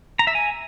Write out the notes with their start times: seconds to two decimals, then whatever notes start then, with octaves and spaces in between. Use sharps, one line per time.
0.19 A#5
0.27 E5
0.35 G#5